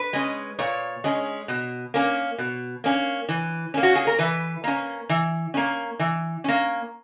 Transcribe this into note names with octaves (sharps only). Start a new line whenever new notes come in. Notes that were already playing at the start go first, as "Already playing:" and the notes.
Already playing: B4
G#3 C#4
A#2 C#5
G#3 C#4
B2
A#3 C#4
B2
A#3 C#4
E3
A#3 C#4
F#4
G#4
A#4
E3 B4
A#3 C#4
E3
A#3 C#4
E3
A#3 C#4